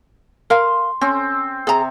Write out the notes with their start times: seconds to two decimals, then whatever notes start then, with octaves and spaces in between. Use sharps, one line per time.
0.50 A#4 F5 C6
1.01 C4 C#4
1.67 C3 G#4 A#5